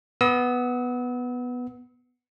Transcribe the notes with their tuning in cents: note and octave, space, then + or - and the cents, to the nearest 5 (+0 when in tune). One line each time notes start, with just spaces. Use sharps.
B3 +0 E6 -40